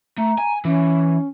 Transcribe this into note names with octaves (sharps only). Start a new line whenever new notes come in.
A3 A#5
G#5
E3 C#4